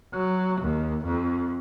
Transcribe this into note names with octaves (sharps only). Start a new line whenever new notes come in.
F#3
D#2
F2